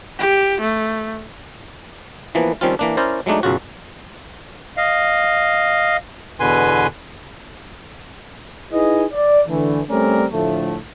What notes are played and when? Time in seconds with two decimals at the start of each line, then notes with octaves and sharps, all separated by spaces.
0.19 G4
0.61 A3
2.35 E3 F3 A#3 B3
2.61 D#3 F3 G3 C4 C#4 F4
2.79 E3 A#3 D4
2.97 C#4 E4 A#4 C5 D5
3.26 F#3 G#3 A3 D4 D#4
3.43 B1 F#2 C#3 F4 F#4
4.77 D#5 F5
6.40 E2 B2 D3 B4 G#5 C6
8.72 D#4 E4 G#4 B4 D#5
9.12 D5
9.48 D3 E3 A3
9.90 G3 A3 C4 C#4 A#4 D5
10.32 A2 D3 F3 A3